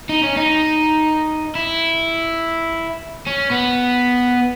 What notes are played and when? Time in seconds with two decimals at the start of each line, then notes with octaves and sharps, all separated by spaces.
0.09 D#4
0.23 C#4
0.37 D#4
1.55 E4
3.26 C#4
3.51 B3